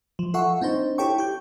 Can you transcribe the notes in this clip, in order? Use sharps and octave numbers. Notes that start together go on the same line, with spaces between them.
F3
F4 A4 E5 F#5 C#6
C4 D4 D#4 C5
E4 G4 A4 C#5 G5 C#6
G4 G6